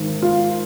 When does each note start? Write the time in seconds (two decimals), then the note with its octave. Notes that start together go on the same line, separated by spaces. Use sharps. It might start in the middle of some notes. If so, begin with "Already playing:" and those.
Already playing: G#1 G#2 D#3
0.22 F4